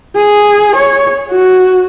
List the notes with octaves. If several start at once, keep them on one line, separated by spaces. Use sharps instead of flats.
G#4
C#5
F#4